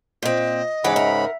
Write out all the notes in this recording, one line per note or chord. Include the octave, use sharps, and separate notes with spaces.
A#2 C4 D#5
G#2 C#3 E3 C#5 D5 F#5 B5
A#4 E5